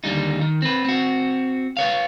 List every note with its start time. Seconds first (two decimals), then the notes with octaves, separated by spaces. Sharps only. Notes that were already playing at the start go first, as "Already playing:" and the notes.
0.04 D#2 D3 G3 D#4
0.41 D#3
0.62 C4 B4
0.85 C4 F#4
1.77 B4 C#5 F5